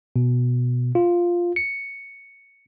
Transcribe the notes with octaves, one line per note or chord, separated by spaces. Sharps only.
B2
F4
C#7